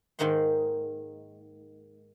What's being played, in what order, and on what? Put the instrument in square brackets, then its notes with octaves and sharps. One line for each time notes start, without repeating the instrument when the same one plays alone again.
[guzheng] G#2 D#3 A#3 F#5 C6